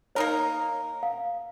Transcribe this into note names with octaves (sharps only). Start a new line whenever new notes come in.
A#3 D#4 A#4 C#5
F5